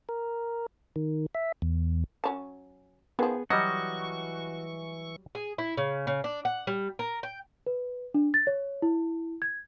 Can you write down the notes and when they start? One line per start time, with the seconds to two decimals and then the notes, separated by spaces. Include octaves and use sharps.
0.09 A#4
0.96 D#3
1.35 E5
1.62 E2
2.24 F#3 C#4 A5
3.19 D#3 F3 B3 G#4
3.50 E3 F#3 G3 F#4 D#5 C#6
5.35 G#4
5.58 E4
5.77 C#3
6.07 C#3
6.24 D4
6.45 F#5
6.67 G3
6.99 A#4
7.23 G5
7.66 B4
8.14 D4
8.34 A6
8.47 C#5
8.82 E4
9.42 G#6